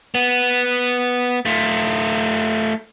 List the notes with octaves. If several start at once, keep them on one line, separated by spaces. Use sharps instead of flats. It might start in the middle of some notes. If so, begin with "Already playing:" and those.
B3
A3 F4